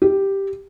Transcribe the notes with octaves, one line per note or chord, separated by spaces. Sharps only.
G4